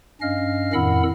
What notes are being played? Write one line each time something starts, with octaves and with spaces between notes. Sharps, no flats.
G2 C#4 D#5 F5 F6
F2 A2 D#3 F#5 B5 E6